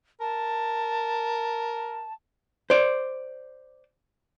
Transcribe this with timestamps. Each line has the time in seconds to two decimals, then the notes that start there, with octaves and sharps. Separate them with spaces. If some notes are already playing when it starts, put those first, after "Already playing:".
0.20 A#4 A5
2.70 C5 D5